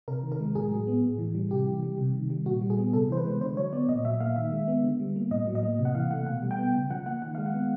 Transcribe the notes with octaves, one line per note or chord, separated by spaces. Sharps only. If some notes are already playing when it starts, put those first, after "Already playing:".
C3 A#4
D#3
A#4
G#3
A2 G#4
F#3
B3
A2
E3
G3
C3 G4
E3
G3
C3
D#3
G3
A#2 F#4
G3
G#4
B3
C3 A4
E3 C5
B4
G#3
D3 C5
F#3 C#5
B3 D5
A#2 D#5
F#3 E5
A#3 F5
D#3 E5
G#3
B3
D3
G3
A#3
A2 D#5
F#3
D#5
A#3
C3
F#5
E3 F5
A3 F#5
B2 F#5
G3
G5
B3
C#3 G5
F3 F#5
A#3 F#5
D#3 F#5
G#3 F5
F#5
B3